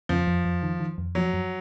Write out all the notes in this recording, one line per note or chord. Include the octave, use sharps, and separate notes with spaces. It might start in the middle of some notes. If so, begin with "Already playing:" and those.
F2 F3
F2
F2
D#3
D#3
F2
F3 F#3
F#2